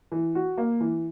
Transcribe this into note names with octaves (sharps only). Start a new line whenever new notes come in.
E3
F#4
A#3
E3